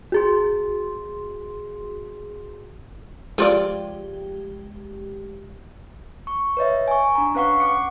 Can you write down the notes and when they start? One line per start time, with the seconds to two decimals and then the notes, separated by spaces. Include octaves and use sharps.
0.12 F#4 G#4 C6
3.38 F3 G#3 F4 G4 D5
6.27 C#6
6.57 B4 C#5 D#5 E5
6.88 G#5 C#6
7.15 D4 A#5
7.35 C#4 B4 F5 F#5 C#6
7.60 F#5 D6 C#7